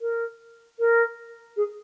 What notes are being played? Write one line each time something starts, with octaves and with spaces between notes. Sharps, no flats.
A#4
A#4
G#4